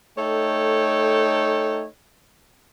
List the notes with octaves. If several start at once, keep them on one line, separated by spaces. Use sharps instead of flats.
A3 D#4 A4 C#5 G5